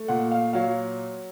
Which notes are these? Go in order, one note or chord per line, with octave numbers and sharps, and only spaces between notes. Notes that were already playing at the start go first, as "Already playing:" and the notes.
Already playing: A3
A#2 F#5
F5
F#3 F5